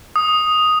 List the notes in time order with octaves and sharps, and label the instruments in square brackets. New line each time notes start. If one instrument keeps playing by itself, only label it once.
[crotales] D#6